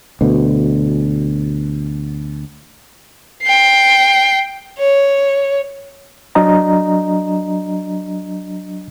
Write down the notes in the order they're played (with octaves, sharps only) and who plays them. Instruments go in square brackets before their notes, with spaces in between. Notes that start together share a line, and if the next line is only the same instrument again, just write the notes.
[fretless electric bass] D2 B2
[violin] G5 C7
C#5
[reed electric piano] F#3 D4 D#5 A#5